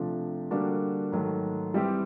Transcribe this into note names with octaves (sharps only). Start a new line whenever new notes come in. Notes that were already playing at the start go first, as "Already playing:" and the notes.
Already playing: C3 F3 A3 D4
D3 G3 A#3 D4 F#4
G#2 D#3 F#3 A3
E3 G3 C4 E4 G4